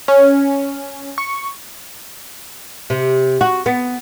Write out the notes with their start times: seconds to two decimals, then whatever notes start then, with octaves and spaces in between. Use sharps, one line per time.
0.08 C#4
1.18 C#6
2.90 C3
3.41 F#4
3.66 B3